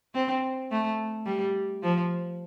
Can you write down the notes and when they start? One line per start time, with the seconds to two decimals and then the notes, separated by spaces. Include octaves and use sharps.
0.15 C4
0.71 A3
1.26 G3
1.83 F3